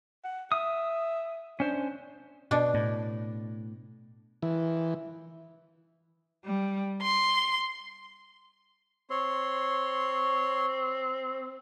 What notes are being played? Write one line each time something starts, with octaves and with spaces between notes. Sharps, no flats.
F#5
E5 D#6
C#4 D4 C5
B2 D4
A2
E3
G3
C6
C4 C#5 C6